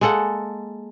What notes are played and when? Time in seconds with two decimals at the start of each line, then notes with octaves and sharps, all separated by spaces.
0.01 G#3 A#3 A4 F#5